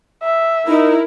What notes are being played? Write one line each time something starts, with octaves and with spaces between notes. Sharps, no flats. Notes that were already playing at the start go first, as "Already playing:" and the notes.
E5
D#4 E4 A#4